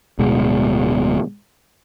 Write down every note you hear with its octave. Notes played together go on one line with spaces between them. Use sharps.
D1 B2 G#3